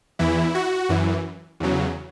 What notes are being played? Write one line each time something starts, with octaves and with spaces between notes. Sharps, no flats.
E2 E3 E4
F#4
F#2 E3
E2 C#3 F#3